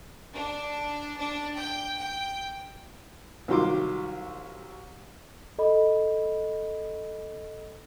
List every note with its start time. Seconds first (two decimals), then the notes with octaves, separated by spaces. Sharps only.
0.34 D4
1.19 D4
1.56 G5
1.99 G5
3.48 C2 D#3 F#3 F4 C6 D6
5.58 A4 D#5 B5